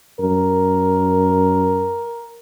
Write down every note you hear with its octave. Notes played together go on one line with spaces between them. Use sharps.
F#2 A#4